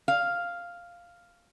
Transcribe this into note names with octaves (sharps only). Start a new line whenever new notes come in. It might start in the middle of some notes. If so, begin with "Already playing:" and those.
F5